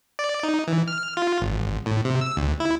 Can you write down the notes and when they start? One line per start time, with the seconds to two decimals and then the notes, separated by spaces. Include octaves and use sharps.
0.19 D5
0.43 D#4
0.68 E3
0.88 F6
1.17 F4
1.40 G#1
1.86 A2
2.05 C3
2.21 E6
2.37 D2
2.60 E4